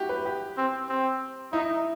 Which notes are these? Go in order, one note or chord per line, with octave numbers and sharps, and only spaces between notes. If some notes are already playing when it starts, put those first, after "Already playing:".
Already playing: E4 F#4 G4
B4
G4
C4
C4
D#4 E4